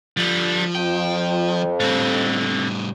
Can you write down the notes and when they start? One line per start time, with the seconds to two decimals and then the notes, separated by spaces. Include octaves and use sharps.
0.17 D3 F3 G3
0.75 F2 G5
1.80 A2 D3 G3 C4